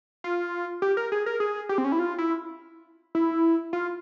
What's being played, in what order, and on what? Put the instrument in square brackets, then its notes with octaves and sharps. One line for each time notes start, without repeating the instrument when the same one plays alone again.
[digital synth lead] F4
G4
A#4
G#4
A#4
G#4
G4
C4
C#4
E4
F4
E4
E4
F4